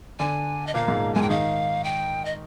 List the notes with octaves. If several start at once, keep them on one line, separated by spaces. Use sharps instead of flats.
D3 D4 G#5
D#5
A#2 A#3 F5
G#2 G#3
G#2 G#3 G#5
G5
D#3 D#4 F5
G5
D#5